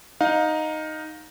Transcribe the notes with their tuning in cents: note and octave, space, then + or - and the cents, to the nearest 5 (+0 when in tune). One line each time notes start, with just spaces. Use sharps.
D#4 +0 F5 +25